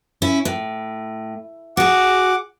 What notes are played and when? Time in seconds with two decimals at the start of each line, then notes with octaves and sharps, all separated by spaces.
0.22 C#4 E4
0.45 A2
1.77 F#4 G#4 F#5 D6